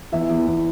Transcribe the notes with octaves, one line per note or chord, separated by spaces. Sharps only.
E2 E5
E2
E2